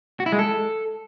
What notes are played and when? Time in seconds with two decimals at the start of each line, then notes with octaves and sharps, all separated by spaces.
0.20 F#4
0.26 E4
0.32 G#3
0.39 A4